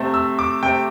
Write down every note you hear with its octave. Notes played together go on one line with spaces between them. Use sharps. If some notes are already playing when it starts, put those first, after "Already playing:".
Already playing: C3 A3 C4
E6
D6
C3 A3 C4 G5